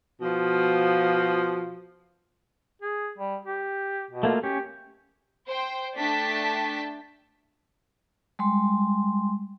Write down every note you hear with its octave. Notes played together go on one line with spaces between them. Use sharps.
B2 F3
G#4
G3
G4
B2
A3 A#3 F4
C#4 G4
C5 G5
A3 D4 G5 A5 B6
G3 G#3 C6